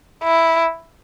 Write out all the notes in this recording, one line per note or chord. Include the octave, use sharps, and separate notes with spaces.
E4